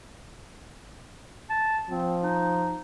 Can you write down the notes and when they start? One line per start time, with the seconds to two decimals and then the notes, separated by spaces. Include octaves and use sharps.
1.50 A5
1.89 F3 C4
2.23 D#4